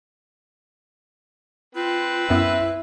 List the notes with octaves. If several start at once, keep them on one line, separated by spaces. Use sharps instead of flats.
C4 F4 B4 G5
F#2 B3 E4 E5